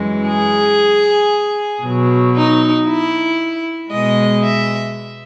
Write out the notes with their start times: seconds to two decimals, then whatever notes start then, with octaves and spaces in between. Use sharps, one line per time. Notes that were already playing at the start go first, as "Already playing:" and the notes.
Already playing: F#2 E3 G#3
0.27 G#4
1.83 B2 F#3
2.35 D#4
2.87 E4
3.91 B2 G#3 D#5
4.43 E5